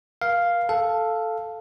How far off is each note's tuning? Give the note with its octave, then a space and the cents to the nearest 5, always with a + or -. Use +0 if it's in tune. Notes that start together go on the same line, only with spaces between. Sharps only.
A#4 +35 F5 +0
A4 +0 F5 +0